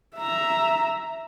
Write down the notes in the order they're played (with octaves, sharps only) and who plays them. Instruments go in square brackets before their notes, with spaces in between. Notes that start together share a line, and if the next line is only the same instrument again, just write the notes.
[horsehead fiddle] E5 A#5